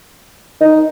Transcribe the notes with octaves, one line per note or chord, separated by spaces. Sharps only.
D#4